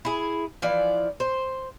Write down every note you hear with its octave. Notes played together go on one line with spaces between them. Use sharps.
E4 G#4
E3 F3 D5
C5